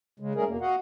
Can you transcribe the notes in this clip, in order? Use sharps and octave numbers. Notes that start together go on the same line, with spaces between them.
C#3 G#3
G3 A3 C#4 G#4 A#4
E2 B2 A#3
F#4 D#5 F5 F#5